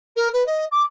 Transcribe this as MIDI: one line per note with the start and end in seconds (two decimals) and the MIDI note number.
0.16 0.28 70
0.33 0.43 71
0.46 0.65 75
0.71 0.82 86